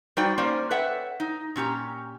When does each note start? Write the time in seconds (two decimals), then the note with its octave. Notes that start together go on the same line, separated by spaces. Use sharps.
0.17 G3 D#4 F#4 C5 D5 G5
0.38 A#3 C#4 C5 D5
0.70 A4 B4 C#5 E5 F#5 G5
1.20 D#4
1.56 A#2 C#4 G4 A#5